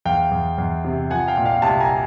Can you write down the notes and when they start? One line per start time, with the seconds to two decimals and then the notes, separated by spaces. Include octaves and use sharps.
0.05 E2 F5 G5
0.31 E2
0.58 E2
0.85 C3
1.10 F3 F#5 G#5
1.28 F5 G5
1.37 A#2
1.45 F5 G5
1.62 C2 G5 A5
1.80 G#5 A#5